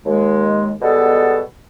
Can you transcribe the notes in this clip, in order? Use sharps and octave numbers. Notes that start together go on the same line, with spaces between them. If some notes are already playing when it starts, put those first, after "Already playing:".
D#2 G#3
B2 G3 G#3 B3 A4